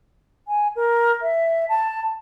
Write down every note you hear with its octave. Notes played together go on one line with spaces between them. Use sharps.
G#5
A#4
E5
A5